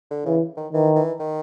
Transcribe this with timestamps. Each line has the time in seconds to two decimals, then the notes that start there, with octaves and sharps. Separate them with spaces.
0.11 D3
0.25 C#3 E3
0.57 D#3
0.73 D#3 E3
0.96 E3
1.19 D#3